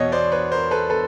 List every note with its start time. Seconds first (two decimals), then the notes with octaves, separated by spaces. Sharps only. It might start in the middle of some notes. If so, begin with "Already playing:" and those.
Already playing: E2 B2 C#5 D#5
0.12 C5 D5
0.32 B4 C#5
0.52 A#4 C5
0.71 A4 B4
0.90 A4 B4